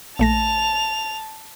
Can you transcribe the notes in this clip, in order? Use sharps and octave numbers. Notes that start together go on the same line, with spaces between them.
A#1 A3 A5 A#6 F7